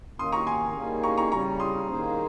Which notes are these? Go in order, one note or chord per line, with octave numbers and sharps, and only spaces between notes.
D#3 A#3 C#4 C6 D#6
A#5 C#6
G#5 C6
D#3 G3 A#3 C#4 G#4
A#5 C#6
A#5 C#6
C#3 G3 C#4 A#5 C#6
C6 D#6
D#3 A#3 D#4 G#4 C5